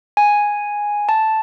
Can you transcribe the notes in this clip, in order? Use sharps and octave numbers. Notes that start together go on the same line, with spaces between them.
G#5
A5